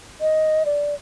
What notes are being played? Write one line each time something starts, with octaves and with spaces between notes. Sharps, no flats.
D#5
D5